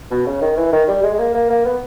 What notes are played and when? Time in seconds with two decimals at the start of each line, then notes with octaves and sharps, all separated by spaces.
0.11 B2
0.26 C#3
0.41 D#3
0.57 E3
0.72 D#3
0.88 G3
1.03 G#3
1.13 G#3
1.19 A#3
1.34 A#3
1.50 A#3
1.65 B3